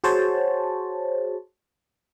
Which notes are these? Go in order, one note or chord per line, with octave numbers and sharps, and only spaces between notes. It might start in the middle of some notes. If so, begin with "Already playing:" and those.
F#4 G#4 C5 C#5 A5